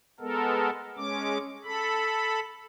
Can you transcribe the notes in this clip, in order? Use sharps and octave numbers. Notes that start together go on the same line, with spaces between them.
G#3 B3 A4 A#4
G#3 C#4 D6
A4 B5